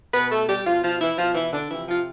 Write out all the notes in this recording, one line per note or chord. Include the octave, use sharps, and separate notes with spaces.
B2 B3 B4
A3 A4
G3 G4
B2 F3 F4
F3 F4
E3 E4
B2 F3 F4
E3 E4
D3 D4
C3 E3 F3 E4
F3 F4